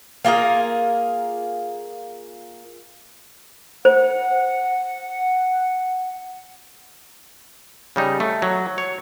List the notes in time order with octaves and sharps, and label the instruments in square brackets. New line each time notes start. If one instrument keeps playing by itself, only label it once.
[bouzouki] A#3 F4 G#4 A#4
[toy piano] C5 [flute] F#5
[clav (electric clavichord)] C#3 G3 D#4
A3
F#3
C#5